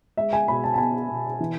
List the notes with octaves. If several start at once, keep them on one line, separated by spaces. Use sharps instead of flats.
G#3 E5
G#5
B2 B5
A5
A5
B3 G#5
B2
E3